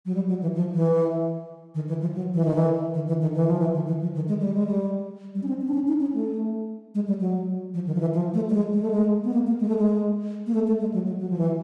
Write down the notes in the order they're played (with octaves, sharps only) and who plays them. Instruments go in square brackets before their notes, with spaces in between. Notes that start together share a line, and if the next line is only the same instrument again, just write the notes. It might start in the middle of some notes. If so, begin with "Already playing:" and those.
[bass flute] F#3
G3
F#3
E3
F3
E3
D#3
E3
F3
F#3
E3
D#3
E3
D#3
E3
D#3
E3
F3
E3
D#3
E3
F3
D#3
G#3
G3
G#3
G3
G3
C#4
C4
C4
D4
C#4
D#4
C#4
A3
G#3
G3
F#3
F3
D#3
F3
E3
F3
A3
G3
G#3
G#3
A3
G#3
B3
A#3
A#3
G#3
A3
G#3
A#3
A3
A3
G#3
F#3
F#3
F#3
F3
E3